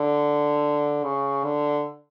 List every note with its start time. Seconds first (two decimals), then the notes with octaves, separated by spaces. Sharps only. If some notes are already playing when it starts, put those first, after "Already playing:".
Already playing: D3
1.04 C#3
1.44 D3